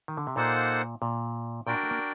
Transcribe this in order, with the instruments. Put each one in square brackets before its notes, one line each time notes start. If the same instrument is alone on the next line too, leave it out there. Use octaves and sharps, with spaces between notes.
[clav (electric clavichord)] D#3
D3
C3
[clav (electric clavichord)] A#2 [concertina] A#3 D#4 A4 C5 F#5
[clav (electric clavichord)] A#2
[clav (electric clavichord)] A#2 [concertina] D4 F#4 A#4 D5 G5
[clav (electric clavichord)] A3
A#3